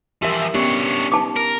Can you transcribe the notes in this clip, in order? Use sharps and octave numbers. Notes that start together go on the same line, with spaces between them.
E3 F3 G4 A#4 E5
B3 C#4 D4 G4 C#5
A5 D6
A#4